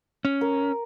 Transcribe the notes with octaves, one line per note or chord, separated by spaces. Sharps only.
C#4
A#4